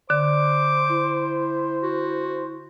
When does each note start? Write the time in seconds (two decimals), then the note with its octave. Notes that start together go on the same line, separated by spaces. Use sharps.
0.10 D3 C5 D6
0.89 E4
1.83 F#4